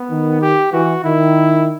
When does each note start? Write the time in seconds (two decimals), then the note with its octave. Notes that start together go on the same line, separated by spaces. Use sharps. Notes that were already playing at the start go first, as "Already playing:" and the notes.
Already playing: B3
0.11 D#3
0.41 G4
0.72 E3 F#4
1.04 D#3 E4